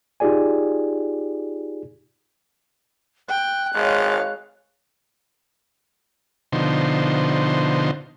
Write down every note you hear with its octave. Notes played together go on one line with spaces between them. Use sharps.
D#4 F4 G4 G#4 D5 G#5
G5 F#6
G#1 G#3 C#5 F5
B2 D3 F3 D#4 C5